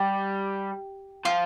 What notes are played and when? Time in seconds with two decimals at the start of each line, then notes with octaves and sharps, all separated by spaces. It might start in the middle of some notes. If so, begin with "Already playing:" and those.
Already playing: G3 G4
1.25 F3 F4